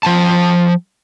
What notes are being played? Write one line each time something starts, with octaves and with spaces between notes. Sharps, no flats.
F3 G5 A5